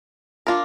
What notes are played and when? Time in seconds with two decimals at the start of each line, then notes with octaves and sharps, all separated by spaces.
0.47 D4 F4 A#4